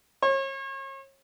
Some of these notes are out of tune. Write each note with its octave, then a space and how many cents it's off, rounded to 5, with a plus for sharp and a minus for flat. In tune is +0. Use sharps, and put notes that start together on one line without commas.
C#5 -40